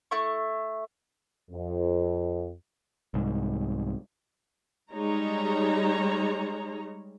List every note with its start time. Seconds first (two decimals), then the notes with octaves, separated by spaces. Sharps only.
0.11 A3 E4 C#6
1.50 F2
3.14 C2 G#2
4.92 G3 G#3 D#4 C#5 A#5